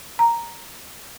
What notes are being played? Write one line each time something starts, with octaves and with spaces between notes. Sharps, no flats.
A#5